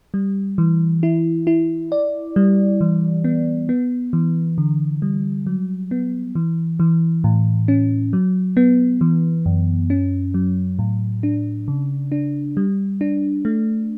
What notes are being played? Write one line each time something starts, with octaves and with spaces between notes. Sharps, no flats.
G3
E3
E4
E4
D5
G3
E3
B3
B3
E3
D3
G3
F#3
B3
E3
E3
A2
C#4
F#3
B3
E3
F#2
C#4
F#3
A2
D4
C#3
D4
G3
D4
A3